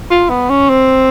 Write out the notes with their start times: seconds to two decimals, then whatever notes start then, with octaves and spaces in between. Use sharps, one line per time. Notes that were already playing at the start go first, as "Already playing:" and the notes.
0.10 F4
0.30 B3
0.50 C#4
0.69 C4